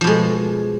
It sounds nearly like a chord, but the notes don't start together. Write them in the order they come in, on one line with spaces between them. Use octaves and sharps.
F3 B2 G#3